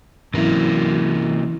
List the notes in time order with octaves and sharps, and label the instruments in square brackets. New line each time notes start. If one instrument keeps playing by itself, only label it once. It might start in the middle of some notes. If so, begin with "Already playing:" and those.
[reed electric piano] G#2 E4 [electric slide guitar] C3 A#3 [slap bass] E3 C#4 [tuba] F#3